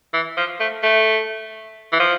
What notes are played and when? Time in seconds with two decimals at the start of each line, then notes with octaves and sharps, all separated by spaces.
0.14 E3
0.37 F3
0.60 A3
0.83 A3
1.92 E3
1.99 F3